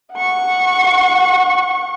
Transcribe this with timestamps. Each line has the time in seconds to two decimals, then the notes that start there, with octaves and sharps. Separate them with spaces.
0.14 F#5 C#6